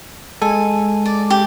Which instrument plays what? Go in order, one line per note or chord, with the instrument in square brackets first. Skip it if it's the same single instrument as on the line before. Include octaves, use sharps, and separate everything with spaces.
[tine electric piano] G#3 A4 [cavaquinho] G#5
[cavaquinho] D5
G4